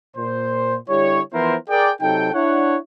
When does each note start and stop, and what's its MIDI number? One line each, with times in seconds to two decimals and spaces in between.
0.17 0.76 46
0.17 0.76 72
0.89 1.21 50
0.89 1.21 55
0.89 1.21 64
0.89 1.21 67
0.89 1.21 73
1.33 1.55 52
1.33 1.55 53
1.33 1.55 59
1.33 1.55 64
1.33 1.55 70
1.33 1.55 72
1.69 1.91 68
1.69 1.91 70
1.69 1.91 74
1.69 1.91 79
2.01 2.31 48
2.01 2.31 54
2.01 2.31 63
2.01 2.31 69
2.01 2.31 79
2.33 2.76 62
2.33 2.76 64
2.33 2.76 73
2.33 2.76 78